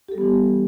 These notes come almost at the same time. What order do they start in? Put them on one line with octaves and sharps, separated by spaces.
G4 A4 G3 B3 E3